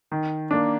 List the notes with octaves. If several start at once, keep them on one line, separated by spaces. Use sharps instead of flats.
D#3
A#3 D4